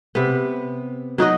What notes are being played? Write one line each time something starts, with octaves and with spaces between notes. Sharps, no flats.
C3 B3
F#3 D#4 F#4 D#5